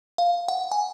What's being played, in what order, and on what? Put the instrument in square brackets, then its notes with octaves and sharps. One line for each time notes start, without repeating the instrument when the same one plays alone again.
[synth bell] F5
F#5
G#5